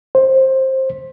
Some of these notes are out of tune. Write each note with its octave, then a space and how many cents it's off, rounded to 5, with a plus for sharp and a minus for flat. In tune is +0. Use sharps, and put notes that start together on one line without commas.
C5 +15